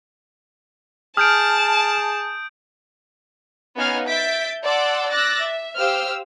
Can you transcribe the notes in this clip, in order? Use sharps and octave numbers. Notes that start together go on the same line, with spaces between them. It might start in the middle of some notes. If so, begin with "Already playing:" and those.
G#4 A5 D#6 F6 G6 D7
B3 C#4 D#4 F5 G#5 F6
E5 G6 A6 B6 D7
D5 F#5 A5 C6 D6 E6
D6 E6 F#6 A6 A#6
E5
G4 C5 F5 E6 F6